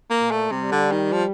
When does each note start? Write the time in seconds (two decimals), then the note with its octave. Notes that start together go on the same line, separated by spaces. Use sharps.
0.10 A#3
0.20 A#2
0.31 A3
0.51 C3 G3
0.72 D3
0.92 D#3
1.12 F3